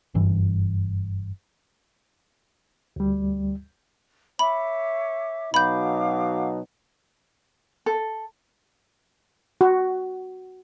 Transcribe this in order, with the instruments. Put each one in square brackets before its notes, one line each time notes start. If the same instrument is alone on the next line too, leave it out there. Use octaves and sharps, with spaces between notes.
[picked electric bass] F#1 G2 E3
[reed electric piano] D2 G3
[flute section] C#5 E5 D6 [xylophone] B5
[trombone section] B2 F#3 D#4 [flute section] F5 D6 [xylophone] B5 G6
[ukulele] A4
[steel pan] F#4